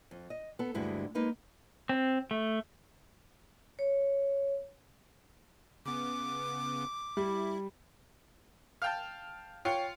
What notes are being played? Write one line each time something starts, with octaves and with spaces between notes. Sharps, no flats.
F2
D#5
B3 A4
D2 G2 D3 G#3 E4 F#4
G#3 A#3 D#4 B4
C4
A3
C#5
C#3 B3 D6
G3 E4
F5 G5 A5
F4 C#5 G5 C#7